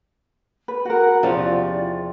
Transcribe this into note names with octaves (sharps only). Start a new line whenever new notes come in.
B4
F#4 A#4 F#5
E2 C3 F3 C#4 F4 G4 G#4 D5